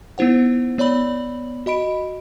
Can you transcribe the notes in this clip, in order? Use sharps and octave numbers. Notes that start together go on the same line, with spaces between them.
B3 D#4 E4 C5 F#5
B3 C#5 D5 B5 F#7
F#4 D#5 B5 D7